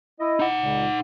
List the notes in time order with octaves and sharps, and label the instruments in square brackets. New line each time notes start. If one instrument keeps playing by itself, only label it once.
[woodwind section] E4 D#5
[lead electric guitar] D#4 F#5
[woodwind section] C#2 A#2 C#3